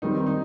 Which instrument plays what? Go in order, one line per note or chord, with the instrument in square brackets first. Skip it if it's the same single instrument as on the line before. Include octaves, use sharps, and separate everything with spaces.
[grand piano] D#3 G3 C4 [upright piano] D#4
[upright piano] D#4